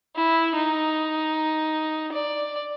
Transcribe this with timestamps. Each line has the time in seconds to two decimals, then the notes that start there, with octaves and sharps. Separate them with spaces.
0.15 E4
0.56 D#4
2.12 D5